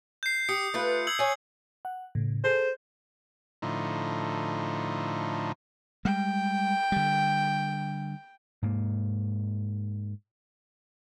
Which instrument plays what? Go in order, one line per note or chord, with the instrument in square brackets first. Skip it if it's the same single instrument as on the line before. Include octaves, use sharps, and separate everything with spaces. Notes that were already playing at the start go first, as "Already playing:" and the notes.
[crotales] G6 C7
[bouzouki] G4 [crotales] D#6 C#7
[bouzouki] A3 F4 B4
[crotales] E6 G#6 F#7
[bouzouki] C#5 G#5
[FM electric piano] F#5
A2 C#3
[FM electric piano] G#4 A4 [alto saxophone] C5
[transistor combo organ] A2 D3 F3 D#4
[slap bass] G3 G#3 [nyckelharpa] G5
[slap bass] D3 G3
G#2 A#3